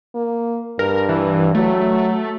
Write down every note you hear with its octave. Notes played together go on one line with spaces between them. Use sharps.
A#3
G2 A#4
E3
F#3 A3